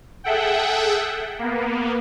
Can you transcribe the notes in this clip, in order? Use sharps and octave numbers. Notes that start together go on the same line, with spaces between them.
G#4 A4 E5 F#5 G5
A#3 B3